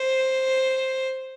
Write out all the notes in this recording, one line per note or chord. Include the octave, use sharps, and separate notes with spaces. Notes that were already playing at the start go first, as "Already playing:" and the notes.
Already playing: C5